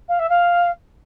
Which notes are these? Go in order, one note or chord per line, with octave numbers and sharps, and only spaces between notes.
F5
E5
F5